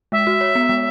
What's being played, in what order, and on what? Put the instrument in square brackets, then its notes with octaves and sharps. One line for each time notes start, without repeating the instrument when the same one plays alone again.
[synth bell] G#3 [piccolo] E5
[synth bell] F#4
C#5
B3
G#3